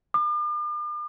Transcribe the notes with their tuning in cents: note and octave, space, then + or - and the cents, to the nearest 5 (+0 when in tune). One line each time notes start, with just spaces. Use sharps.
D6 +45